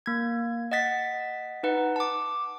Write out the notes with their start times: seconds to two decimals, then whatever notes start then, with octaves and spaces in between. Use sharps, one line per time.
0.06 A#3 G#6
0.72 D#5 F#5 A6 B6
1.63 D#4 B4 F#5
1.96 A5 D6